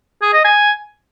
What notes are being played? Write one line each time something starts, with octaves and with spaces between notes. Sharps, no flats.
G#4
D#5
G#5